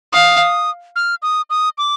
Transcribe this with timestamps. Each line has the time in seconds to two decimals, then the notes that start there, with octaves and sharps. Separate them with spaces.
0.13 F5 D#6
0.96 F6
1.22 D#6
1.50 D#6
1.78 D6